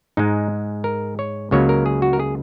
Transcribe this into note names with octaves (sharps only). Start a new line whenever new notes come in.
G#2 G#3 D#4
A#4
C#5
C#2 C#3 F#3 A#3 C#5
A#4
G#4
F#4
A#4
G#4